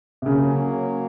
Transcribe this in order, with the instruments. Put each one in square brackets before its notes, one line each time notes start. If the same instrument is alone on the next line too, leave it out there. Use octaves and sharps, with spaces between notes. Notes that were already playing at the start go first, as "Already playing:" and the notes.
[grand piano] C3
[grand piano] C#3 [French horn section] F#3 A#3 C#4